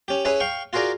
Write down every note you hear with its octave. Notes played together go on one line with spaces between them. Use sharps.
C#4 G4
C#4 E4 G#4 B4 C#5
F5 G5 C#6
F4 F#4 G#4 A#4 D5